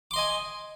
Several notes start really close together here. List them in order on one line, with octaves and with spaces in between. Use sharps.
D6 C6 D#5 G#5